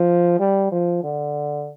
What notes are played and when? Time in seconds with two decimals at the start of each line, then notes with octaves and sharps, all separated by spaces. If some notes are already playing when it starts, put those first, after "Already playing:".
Already playing: F3
0.39 G3
0.72 F3
1.04 D3